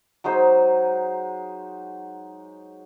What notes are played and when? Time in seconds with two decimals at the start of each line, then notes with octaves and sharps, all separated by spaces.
0.24 F#3 G#3 D#4 C5